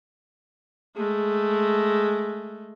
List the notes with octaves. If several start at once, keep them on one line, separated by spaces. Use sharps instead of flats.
G#3 A3